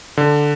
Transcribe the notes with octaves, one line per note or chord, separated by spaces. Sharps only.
D3